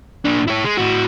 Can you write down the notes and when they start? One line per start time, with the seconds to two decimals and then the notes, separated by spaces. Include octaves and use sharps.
0.25 A#2 D4
0.48 E4 C#5
0.65 G#3
0.77 A2 F#4